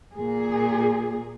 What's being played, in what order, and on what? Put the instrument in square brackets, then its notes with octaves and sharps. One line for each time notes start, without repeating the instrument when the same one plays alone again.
[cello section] A#2 G#4